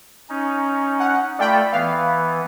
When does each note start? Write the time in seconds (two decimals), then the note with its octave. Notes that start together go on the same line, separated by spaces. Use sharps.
0.29 C#4 D#4
1.00 F#5
1.39 A3 F4 A4 D5 G5 B5
1.73 E3 B3 F5